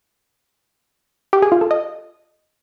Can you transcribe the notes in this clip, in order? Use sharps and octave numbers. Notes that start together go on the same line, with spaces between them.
G4
G#4
F4
A4
D#5